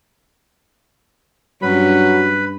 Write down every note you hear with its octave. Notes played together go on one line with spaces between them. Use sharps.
G2 F#3 C#4 B4 B5